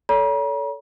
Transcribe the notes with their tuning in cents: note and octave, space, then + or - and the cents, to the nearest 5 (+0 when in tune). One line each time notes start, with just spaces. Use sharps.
A4 +0 C#5 +40 A#5 +45